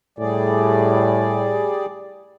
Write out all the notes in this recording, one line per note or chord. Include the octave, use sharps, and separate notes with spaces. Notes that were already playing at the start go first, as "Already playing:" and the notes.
A2 G3 G#4 D5